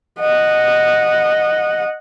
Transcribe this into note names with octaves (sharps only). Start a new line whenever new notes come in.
D#5 F#5